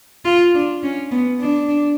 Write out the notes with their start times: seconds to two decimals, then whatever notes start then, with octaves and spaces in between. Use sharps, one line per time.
0.25 F4
0.55 D4
0.83 C#4
1.12 B3
1.41 D4